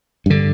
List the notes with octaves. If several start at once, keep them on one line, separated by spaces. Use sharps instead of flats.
G2 D3